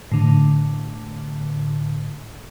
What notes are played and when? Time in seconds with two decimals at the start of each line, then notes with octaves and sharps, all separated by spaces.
0.12 A2 D3